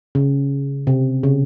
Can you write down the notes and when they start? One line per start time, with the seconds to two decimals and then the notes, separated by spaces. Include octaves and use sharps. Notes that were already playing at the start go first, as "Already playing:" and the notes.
0.15 C#3
0.87 C3
1.23 C#3